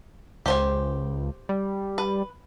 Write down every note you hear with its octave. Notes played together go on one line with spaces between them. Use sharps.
C#2 G4 C5 G#5
G3
B4